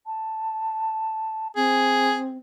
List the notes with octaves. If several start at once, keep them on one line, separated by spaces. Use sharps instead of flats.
A5
C4 G#4